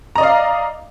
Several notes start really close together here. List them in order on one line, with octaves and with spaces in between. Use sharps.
A#5 D#5 D5 F5